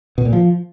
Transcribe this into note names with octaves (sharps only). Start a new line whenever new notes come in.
B2
A#2
F3